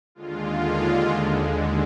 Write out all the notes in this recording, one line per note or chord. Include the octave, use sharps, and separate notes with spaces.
D#2 D3 G#3 F4